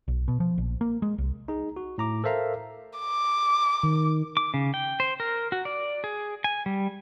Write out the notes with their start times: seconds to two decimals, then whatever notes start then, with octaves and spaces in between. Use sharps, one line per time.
0.08 B1
0.28 B2
0.40 F3
0.58 A#1
0.81 A#3
1.02 G#3
1.18 C2
1.48 D#4 G#4
1.76 F#4
1.98 A2 A#5 D6
2.24 A4 A#4 C5 E5 F5 A#5
2.99 D6
3.83 D#3
4.37 D6
4.54 C#3
4.74 G5
5.00 C5
5.20 A#4
5.52 F#4
5.65 D5
6.04 G#4
6.44 G#5
6.66 G3